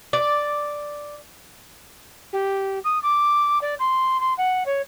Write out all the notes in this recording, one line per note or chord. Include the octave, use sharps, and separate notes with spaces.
D5
G4
D#6
D6
D5
C6
C6
F#5
C#5